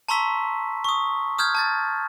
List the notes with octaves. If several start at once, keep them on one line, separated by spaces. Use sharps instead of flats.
A5 A#5 C6 C#6 E6 B6
C#6 D#6
D#6 F6 G6 G#6
A5 G#6 A6